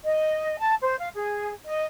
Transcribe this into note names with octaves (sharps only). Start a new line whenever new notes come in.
D#5
A5
C5
F5
G#4
D#5